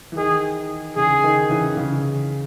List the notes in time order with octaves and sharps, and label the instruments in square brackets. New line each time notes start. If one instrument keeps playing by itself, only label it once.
[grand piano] E3
[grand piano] D#3 [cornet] G#4
[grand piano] C#3 E3 [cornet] G#4
[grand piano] D#3
C#3 E3
C#3